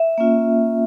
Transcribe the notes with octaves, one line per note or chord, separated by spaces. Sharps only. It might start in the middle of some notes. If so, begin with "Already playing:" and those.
Already playing: E5
A#3 C#4 F4